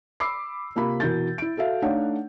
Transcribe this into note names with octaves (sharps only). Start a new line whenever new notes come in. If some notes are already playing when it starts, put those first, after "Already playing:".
B5 D6 E6 C7
C3 A#3 F4 B5
B2 E3 A#4 G6 A6
E4 D7
F#4 A4 E5 F5
A3 D4 D#4 C#5 F5 F#5